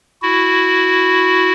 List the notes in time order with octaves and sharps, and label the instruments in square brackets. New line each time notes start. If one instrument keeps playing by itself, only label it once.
[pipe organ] E4 F#4